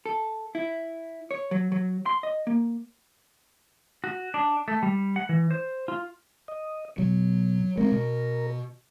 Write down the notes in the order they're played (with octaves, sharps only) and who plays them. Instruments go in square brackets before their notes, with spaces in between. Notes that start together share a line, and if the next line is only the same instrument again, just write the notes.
[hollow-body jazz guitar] A4
E4
C#5
F#3
F#3
C6
D#5
A#3
[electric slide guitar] F#4
D4
A3
G3
F#5
E3
C5
F4
[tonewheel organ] D#5
[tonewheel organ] B2 [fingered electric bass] F#3
[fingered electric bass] G#3 C4 [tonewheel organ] A#4
[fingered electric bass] B2